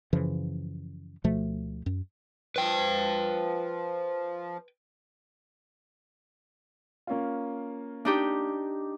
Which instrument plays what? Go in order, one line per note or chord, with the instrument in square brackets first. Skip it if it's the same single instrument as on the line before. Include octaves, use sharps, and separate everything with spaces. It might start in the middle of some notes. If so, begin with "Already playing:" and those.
[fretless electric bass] F#2 C#3 E3 F3
D2 B2 F3 A3
F#2
[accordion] F3 [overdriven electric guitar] B4 G5
[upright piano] A#3 C#4 F4
[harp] D4 D#4 G4